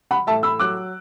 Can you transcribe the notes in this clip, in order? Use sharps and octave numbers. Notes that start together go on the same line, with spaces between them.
F#5 B5
A2 E5 A5
B5 E6
F#3 D6 F#6